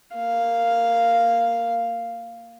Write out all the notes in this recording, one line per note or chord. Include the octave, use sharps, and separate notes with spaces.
A#3 F5